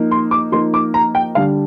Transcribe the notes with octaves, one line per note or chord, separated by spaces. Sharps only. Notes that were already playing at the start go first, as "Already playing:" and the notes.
Already playing: F3 A#3 D#4
C6
D6
F3 A#3 D#4 C6
D6
A#5
G5
D3 G3 D4 F5